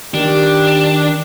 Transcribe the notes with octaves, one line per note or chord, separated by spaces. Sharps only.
D#3 D4 G4